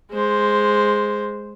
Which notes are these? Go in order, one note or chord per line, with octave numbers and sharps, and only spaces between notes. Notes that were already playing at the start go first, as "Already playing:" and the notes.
G#3 C5